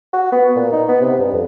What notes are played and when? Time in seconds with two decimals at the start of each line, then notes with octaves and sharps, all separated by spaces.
0.13 F#4
0.32 B3
0.56 A#2
0.73 D#4
0.88 B3
1.01 C3
1.19 G2
1.33 F2